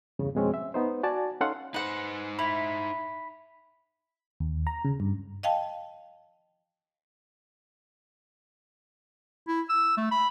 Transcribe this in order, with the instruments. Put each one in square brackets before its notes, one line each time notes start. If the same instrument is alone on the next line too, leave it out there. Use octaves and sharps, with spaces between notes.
[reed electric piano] E2 G2 C#3
F2 B2 G#3 C4 C#4
E5
B3 D#4 C5
F#4 D5 G#5 A5
C#4 D#4 A4 F5 F#5 C6
[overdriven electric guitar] D#4 C5 [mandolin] B4 F#5
[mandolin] E4 [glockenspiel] B5 B6
[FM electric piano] D#2
A#5
C#3
G2
[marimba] D#5 F5 G5 A5
[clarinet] E4
E6
A3
B5